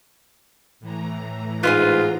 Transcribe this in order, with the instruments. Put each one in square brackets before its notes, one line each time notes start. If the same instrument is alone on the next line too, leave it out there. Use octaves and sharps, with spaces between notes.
[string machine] A2 E3 A#5
[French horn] G#2 [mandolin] B3 E4 G#4 [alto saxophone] F4